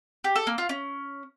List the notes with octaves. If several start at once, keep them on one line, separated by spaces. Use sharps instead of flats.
G4
A4
A#3
F4
C#4